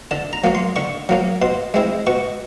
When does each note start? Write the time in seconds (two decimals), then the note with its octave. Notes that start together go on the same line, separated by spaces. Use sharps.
0.11 D3 A5
0.33 A#5
0.44 F#3 A#3 C#4
0.55 C6
0.76 D3 C#6
1.09 F#3 A#3 C#4
1.42 B2 C6
1.74 G#3 C4 E4
2.07 B2 C#6